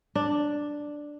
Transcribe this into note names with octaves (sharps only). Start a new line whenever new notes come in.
D4